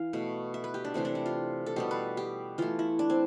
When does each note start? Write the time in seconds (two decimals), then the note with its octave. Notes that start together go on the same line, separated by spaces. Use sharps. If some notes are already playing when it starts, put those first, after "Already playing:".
Already playing: E3 F5
0.13 B2 A3
0.54 E5
0.64 B4
0.74 G4
0.85 D4
0.94 C3 E3 A3 C4
1.05 D4
1.15 E4
1.26 F4
1.66 A4
1.76 B2 G3 B3 G4
1.91 B4
2.17 G4
2.58 E3 A3 F4
2.79 E4
2.99 D4
3.10 C4